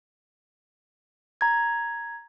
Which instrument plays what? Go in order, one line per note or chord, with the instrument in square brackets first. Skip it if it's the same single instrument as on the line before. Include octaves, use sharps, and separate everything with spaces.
[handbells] A#5 G#6